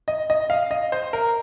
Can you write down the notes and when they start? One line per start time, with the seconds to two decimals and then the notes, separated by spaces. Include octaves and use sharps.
0.08 D#5
0.30 D#5
0.50 F5
0.71 D#5
0.92 C5
1.13 A#4